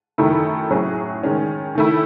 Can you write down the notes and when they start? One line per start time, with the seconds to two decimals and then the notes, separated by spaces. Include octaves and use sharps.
0.18 F#2 D#3 A3 E4
0.70 A2 F#3 C#4 G#4
1.23 D#3 G#3 C#4
1.75 D#3 A3 E4